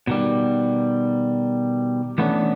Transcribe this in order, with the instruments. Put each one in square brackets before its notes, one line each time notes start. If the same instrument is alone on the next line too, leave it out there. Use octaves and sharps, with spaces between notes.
[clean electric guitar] B2 D#3 G3
E3 A3 B3 C#4 D4